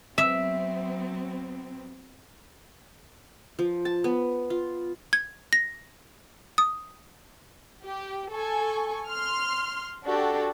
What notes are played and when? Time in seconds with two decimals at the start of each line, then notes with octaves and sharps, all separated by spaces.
0.18 F#3 B3 C4 E5
3.59 F3
3.85 A5
4.04 B3
4.50 F4
5.13 G#6
5.53 A#6
6.58 D#6
7.83 G4
8.32 A4 G#5 C#6
9.08 C6 F6
10.04 D4 F#4 G4 A4